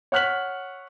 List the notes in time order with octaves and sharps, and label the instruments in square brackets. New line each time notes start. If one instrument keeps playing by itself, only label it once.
[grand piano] C#5 F#5 F6 F#6 B6 F#7